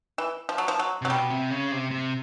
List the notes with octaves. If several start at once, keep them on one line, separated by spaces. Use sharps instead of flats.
E3
F3
F#3
F3
F#3
C3 F#3
B2 G3
C3
C#3
C3
C3